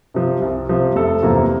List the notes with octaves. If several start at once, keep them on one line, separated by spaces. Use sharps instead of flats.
C3 F3
C2
C3 F3
F1 A4
E2 C3 F3 A#3